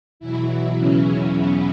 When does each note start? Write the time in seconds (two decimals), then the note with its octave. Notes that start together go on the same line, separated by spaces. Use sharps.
0.20 E2 B2 E3 F#3 E4
0.78 C#3 C#4
1.37 B2 B3